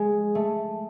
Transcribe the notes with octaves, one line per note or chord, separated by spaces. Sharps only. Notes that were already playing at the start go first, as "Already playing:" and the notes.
Already playing: G#3
A3